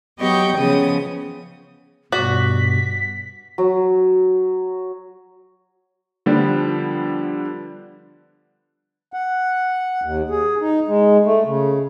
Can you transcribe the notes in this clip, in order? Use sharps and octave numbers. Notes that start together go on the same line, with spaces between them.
F#3 B3 G4 D#5 G5 C#6
C#3 F3 B3 G#4 D#6
G2 B2 F#4 D5 B6
F#3
D3 F3 G3 B3 D4
F#5
D#2
G#4
D#4
G#3
A3
C#3